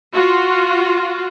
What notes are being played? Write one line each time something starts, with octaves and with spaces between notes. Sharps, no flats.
F4 F#4